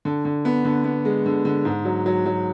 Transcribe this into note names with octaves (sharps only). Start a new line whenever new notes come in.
D3
D3
B3
D3
B3
G#3
D3
D3
G#2
F#3
F#3
F#3